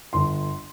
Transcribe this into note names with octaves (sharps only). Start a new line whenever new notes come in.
G1 C6